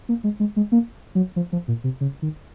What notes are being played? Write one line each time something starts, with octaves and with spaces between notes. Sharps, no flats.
A#3
G#3
G#3
G#3
A#3
F#3
F3
F3
A#2
C3
C#3
D#3